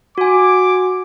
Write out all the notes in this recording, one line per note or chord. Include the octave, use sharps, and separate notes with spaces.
F#4 G#5 D6